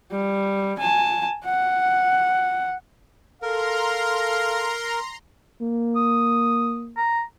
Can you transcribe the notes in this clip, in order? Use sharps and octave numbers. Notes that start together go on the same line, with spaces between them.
G3
G#5 A5
F#5
A4 A#4 F5 A#5 C6
A#3
D#6
A#5